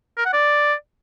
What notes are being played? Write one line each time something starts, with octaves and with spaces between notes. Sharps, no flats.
A#4
F#5
D5